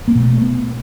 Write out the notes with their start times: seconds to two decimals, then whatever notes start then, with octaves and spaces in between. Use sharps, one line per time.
0.08 A#3
0.15 B2 A3
0.42 B3